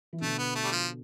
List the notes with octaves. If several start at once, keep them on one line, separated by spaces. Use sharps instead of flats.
E3
B2 D3 A3
B3
A3
G3
F3